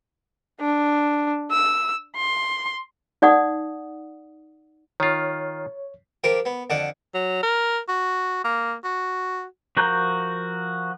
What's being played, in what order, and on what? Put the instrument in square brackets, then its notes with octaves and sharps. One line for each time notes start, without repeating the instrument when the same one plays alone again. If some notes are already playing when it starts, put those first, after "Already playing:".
[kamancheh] D4
E6
C6
[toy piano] D#4 D5 F#5 D#6
[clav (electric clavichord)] D#3 F4 [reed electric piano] C#5
[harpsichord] F3 G4 A#4 C5 D6
B3
F2 D3 D#5 F#5 D6
[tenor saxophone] F#3
A#4
F#4
A#3
F#4
[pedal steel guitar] F3 F#4 A#4 A#5 G6